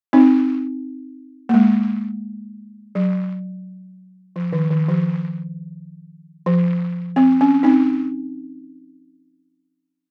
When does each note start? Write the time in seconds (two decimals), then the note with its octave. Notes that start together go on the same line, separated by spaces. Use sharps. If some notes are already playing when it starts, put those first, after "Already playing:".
0.13 C4 D#4
1.49 A#3
1.54 G#3
2.95 F#3
4.36 F3
4.53 D#3
4.70 D#3
4.89 F3
6.46 F3
7.16 C4
7.41 C#4
7.63 C4 D#4